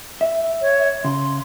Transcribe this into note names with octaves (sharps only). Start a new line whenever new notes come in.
E5
C#5
C#3 C6